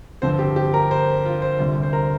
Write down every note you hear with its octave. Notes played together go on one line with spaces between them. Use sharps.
G2 D3 F3 C4 C5
G4
G4
A#4
C5
F4
C5
D2 C3 G3
C5
A#4